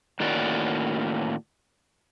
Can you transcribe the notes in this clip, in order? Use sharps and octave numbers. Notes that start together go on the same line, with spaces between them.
A2 D#3 A#3 C#4 F#4 D5